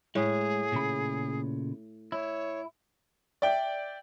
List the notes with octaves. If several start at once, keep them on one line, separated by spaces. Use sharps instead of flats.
A2 G#3 G#4
A#2 C#3 B5
E4 C#5
D5 E5 G5